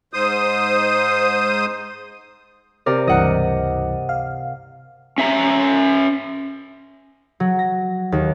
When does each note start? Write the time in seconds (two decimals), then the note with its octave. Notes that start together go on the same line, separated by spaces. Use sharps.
0.13 G#2 C5 D#6
2.86 C3 A#4 D5
3.07 C#2 G2 E3 D#5 F#5
4.09 F5
5.18 C#4 E5 A#5
7.40 F#3
7.59 A#6
8.12 D#2